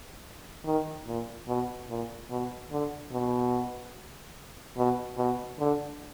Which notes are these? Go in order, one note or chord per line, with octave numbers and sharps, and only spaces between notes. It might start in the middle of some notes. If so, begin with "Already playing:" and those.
D#3
A#2
B2
A#2
B2
D3
B2
B2
B2
D3